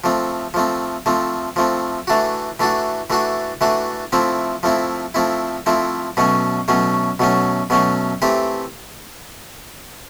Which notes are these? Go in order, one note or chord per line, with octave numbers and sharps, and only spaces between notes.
F3 A3 C4
F3 A3 C4
F3 A3 C4
F3 A3 C4
E3 A3 D4 F#4
E3 A3 D4 F#4
E3 A3 D4 F#4
E3 A3 D4 F#4
F3 A3 C4 E4
F3 A3 C4 E4
F3 A3 C4 E4
F3 A3 C4 E4
B2 F#3 A3 C#4
B2 F#3 A3 C#4
B2 F#3 A3 C#4
B2 F#3 A3 C#4
E3 A3 C4 G4